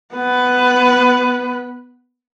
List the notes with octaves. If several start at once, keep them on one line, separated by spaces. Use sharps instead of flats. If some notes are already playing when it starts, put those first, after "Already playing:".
B3 B4